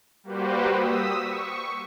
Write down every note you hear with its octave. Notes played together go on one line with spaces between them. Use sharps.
G3 A#3 F#4 G4 B4 C5
D#6 E6 B6
C#6